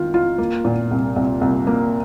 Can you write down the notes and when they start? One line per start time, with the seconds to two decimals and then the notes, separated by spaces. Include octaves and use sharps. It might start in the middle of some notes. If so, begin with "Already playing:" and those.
Already playing: D#3 F4
0.14 F4
0.38 A#3
0.65 A#2
0.91 C2
1.16 C2
1.41 C2
1.67 A#3